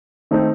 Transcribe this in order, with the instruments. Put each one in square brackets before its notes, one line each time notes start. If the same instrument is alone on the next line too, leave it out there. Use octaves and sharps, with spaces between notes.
[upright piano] D#3 A3 C4 D#4